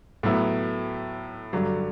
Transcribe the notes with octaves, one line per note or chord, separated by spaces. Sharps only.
A2 F#3 B3 E4
G2 D3 F#3